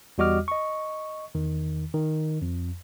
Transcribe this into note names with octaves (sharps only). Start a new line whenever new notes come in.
E2 G3 F#4 D#5 D6 F6
D#5 C#6
E2 D#3
D#3
F2